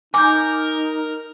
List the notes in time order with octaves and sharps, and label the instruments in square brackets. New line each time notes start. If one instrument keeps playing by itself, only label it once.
[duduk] D#4 [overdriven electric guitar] A#4 [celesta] G#5 G6 [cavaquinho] D6